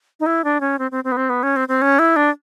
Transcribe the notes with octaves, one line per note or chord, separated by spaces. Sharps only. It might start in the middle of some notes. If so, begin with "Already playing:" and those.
D#4
E4
D4
C#4
C4
C4
C4
B3
C4
B3
C#4
C4
C4
C#4
E4
D4